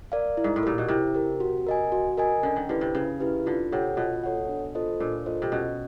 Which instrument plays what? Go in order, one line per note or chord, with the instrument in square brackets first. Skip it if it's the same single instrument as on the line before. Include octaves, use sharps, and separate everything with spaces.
[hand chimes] A#4 D5 F5
E4
[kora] G#2
A2
[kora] A#2 [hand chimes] G4 A#4
[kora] B2
[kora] C3 [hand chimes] E4
[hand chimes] G4 A#4
F#4
A#4 D#5 G#5
F#4
A#4 D#5 G#5
[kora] D3 [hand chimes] C#4
[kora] D#3
[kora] D3 [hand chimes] E4 G4 B4
[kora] C3
[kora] C#3 [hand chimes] C#4
[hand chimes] E4 G4 B4
[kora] D3 [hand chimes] F4
[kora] C3 [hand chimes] A4 C#5 F#5
[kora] B2 [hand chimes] F4
[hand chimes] A4 C#5 F#5
D4
F4 A4 C5 D#5
[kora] A#2 [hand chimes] D4
[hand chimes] F4 A4 C5 D#5
[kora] C3
[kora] B2 [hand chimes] C#4